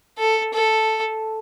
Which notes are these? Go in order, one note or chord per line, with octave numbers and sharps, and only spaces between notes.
A4
A4